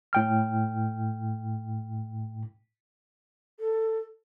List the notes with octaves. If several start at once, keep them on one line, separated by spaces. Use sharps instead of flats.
A2 G5 F6
A4